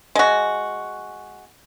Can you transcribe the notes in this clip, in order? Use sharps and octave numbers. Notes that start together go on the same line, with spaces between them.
G#3 F#4